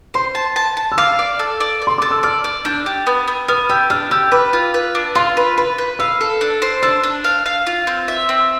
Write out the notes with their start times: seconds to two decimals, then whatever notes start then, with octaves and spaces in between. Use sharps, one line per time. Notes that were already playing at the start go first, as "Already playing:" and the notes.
0.14 C5 C6
0.35 A5
0.56 A5
0.77 A5
0.92 E6
0.98 F5 D6
1.19 D5
1.39 A4
1.60 D5
1.82 D5
1.87 C6
1.98 A4 D6
2.11 E6
2.23 D5 F6
2.44 D5
2.65 D4 G6
2.86 G4
3.07 B3
3.28 B3
3.48 B3 F6
3.69 G4 E6
3.90 D4 F6
4.11 G4 E6
4.32 B4 D6
4.53 F4
4.74 B4
4.95 D4
5.15 F4 C6
5.37 B4
5.58 B4 B5
5.78 B4
5.99 F5 E6
6.21 A4
6.41 D4
6.62 C5
6.83 D4 E6
7.03 D4
7.24 F5
7.46 F5
7.67 F4
7.87 C4
8.08 E5
8.29 C4